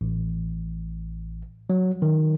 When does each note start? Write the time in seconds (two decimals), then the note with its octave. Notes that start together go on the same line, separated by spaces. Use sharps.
0.01 A1
1.70 F#3
2.02 D#3